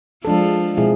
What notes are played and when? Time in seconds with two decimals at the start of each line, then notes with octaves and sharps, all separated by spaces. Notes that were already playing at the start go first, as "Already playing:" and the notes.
0.25 F3 G#3 D4 A4
0.77 B2 G#3 C4 E4 G#4